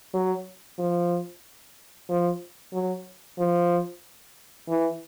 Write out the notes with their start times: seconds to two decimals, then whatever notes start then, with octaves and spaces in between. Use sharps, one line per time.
0.14 F#3
0.79 F3
2.09 F3
2.74 F#3
3.39 F3
4.69 E3